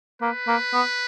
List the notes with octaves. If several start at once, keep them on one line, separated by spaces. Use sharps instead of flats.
A#3 B4
A#3
B3